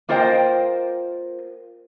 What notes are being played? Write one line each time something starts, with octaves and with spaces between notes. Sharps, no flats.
A#3 F4 A#4 C5 D#5 G5